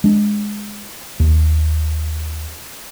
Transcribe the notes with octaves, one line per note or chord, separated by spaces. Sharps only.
G#3 D4
D#2